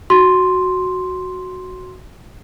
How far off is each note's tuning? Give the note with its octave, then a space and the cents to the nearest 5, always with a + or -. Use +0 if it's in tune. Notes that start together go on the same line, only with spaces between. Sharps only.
F#4 +0 C6 +0